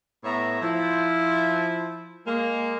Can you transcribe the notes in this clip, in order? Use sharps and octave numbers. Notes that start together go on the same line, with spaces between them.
A2 B3 C#5 E5 A#5
F3 E4
G#3 A#3